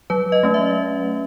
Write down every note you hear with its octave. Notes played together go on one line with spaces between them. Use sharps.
F#3 B4
D#5
A3 C#4
E5